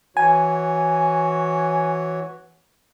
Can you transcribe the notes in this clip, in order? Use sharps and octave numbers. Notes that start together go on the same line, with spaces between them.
E3 F#4 C#5 G#5